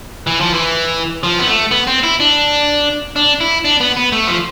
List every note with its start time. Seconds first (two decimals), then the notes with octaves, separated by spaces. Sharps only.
0.27 E3
0.40 F3
0.53 E3
1.23 F3
1.39 B3
1.47 A3
1.71 B3
1.87 C4
2.03 E4
2.20 D4
3.16 D4
3.40 E4
3.65 D4
3.80 B3
3.97 B3
4.12 A3
4.27 F3